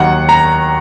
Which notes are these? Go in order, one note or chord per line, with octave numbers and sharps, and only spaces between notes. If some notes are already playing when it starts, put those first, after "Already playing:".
Already playing: D#2 D#3 F#3 F#5
A#5